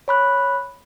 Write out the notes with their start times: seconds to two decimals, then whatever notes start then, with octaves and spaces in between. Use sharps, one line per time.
0.08 C#5 B5 F#6